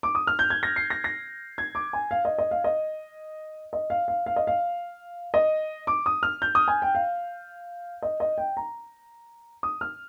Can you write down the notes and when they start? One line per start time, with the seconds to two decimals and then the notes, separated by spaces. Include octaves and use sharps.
0.03 D6
0.15 D#6
0.27 F6
0.39 G6
0.50 G#6
0.63 A#6
0.76 C7
0.90 A#6
1.04 A#6
1.58 G#6
1.75 D6
1.93 G#5
2.11 F5
2.25 D#5
2.38 D#5
2.51 F5
2.64 D#5
3.73 D#5
3.90 F5
4.08 F5
4.26 F5
4.36 D#5
4.47 F5
5.34 D#5
5.87 D6
6.06 D#6
6.23 F6
6.42 G6
6.55 D#6
6.68 G#5
6.82 G5
6.95 F5
8.02 D#5
8.20 D#5
8.38 G5
8.57 A#5
9.63 D#6
9.81 F6